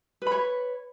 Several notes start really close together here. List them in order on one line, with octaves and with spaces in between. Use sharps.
B4 B5 C#5